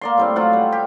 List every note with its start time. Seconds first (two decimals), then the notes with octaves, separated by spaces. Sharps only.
0.01 A#3 D5 C6
0.18 A2 G3 C4
0.36 F#3 F4 C5 F#5
0.53 G3
0.72 G4